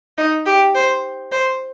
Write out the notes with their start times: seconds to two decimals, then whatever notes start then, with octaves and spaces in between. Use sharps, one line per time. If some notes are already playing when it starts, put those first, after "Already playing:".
0.18 D#4
0.46 G4
0.75 C5
1.32 C5